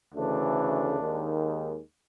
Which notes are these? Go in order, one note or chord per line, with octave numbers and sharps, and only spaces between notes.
D2 C#3 E3 A3 D4
D#2 D#3 G#3